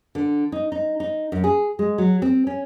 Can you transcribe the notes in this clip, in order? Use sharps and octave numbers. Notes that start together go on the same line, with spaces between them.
D3
D#4
D#4
D#4
F#2
G#4
G#3
F#3
C4
C#4